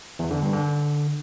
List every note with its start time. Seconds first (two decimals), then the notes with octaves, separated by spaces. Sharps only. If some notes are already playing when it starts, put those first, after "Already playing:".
0.19 E2
0.31 D3
0.42 G2
0.53 D3